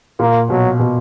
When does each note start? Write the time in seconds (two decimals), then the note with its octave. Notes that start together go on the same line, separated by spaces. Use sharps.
0.19 A#2 A#3
0.50 B2 F#3
0.80 B2